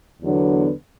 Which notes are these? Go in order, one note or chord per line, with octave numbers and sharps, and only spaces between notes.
E2 D3 F#3 B3 D4